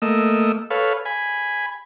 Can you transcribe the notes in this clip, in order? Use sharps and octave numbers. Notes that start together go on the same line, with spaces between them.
A3 A#3 D#5 E6
A4 B4 C#5 F5
G#5 B5